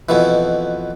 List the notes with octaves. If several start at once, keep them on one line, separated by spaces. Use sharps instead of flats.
F2 B2 E3